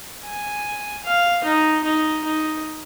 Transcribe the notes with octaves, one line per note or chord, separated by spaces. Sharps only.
G#5
F5
D#4
D#4
D#4